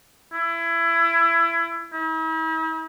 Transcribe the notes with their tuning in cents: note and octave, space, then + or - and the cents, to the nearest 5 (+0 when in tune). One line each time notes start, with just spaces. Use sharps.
E4 +25
E4 -45